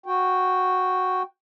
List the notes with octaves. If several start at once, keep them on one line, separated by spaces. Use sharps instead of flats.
F#4 G5